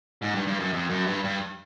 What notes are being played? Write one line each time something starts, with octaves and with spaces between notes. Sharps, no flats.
G#2
G2
G2
F#2
F2
F#2
G2
G2